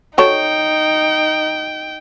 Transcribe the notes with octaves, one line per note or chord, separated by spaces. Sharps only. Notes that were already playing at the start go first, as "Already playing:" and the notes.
D#4 F#4 A4 C#5 G5